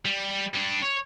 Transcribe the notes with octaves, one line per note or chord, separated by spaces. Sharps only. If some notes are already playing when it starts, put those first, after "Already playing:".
G3
G3 D4
C#5